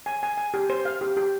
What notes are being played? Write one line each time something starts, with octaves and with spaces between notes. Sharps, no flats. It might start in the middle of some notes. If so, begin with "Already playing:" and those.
G#5
G#5
G#5
G4
C5
F5
G4
G4